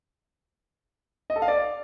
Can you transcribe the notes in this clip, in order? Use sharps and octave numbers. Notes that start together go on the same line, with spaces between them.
D#5
A4
F5
D5